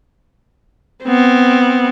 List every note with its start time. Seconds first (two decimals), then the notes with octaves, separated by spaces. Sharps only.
1.05 B3 C4